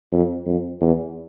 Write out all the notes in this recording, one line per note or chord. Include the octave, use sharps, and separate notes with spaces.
F2
F2
E2